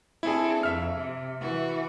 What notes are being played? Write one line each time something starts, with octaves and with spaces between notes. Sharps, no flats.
C4 D4 E4 G#4 A4
F2 E5 F6
C3
E3 F#4